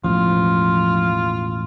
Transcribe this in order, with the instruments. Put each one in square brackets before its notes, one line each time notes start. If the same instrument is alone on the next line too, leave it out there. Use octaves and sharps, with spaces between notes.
[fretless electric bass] E1 A1 [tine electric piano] F3 [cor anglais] F4